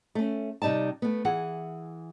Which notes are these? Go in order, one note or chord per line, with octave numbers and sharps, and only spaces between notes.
A3 C#4
C3 G3 D#4 D5 A5
A3 B3
E3 G#4 F#5